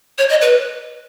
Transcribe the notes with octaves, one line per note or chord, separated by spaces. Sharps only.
C#5
D#5
B4